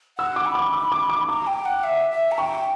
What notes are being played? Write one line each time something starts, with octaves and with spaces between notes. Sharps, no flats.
F#5 E6
D6
B5
D6
D6
D6
D6
A#5 D6
G5
F#5
E5
E5
A#5
G5 C#6